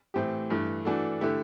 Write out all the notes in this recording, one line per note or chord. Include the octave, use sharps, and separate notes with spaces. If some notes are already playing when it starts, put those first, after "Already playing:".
A2 E3 A3 C4 G4
G2 E3 A3
E3 A3 D4 F#4 A4
D3 A3 E4 G4